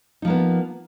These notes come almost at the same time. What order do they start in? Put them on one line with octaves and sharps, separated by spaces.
D#4 F3 A#3 B3